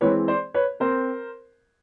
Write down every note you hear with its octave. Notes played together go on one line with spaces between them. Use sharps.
E3 G#3 C4 B4 C#5
C5 D5
B4 C#5
C4 A#4 C5